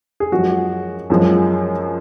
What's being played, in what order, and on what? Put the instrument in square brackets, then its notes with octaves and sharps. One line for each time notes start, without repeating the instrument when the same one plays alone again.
[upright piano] G#4
F#2 F3 G#3 F#4
F#2 F3 G#3